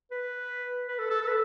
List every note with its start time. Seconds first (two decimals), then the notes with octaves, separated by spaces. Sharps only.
0.11 B4
0.88 B4
0.99 A4
1.10 A4
1.22 A4
1.28 B4